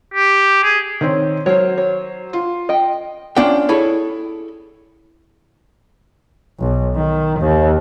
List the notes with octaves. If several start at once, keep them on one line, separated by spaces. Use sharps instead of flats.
G4
G#4
D#3 C4 C#5
F#3 A#4 C5 C#5
C#5
F4
D#5 G5
C#4 D4 F4 G5
E4 G#4 A4 C#5
B1
D#3
D#2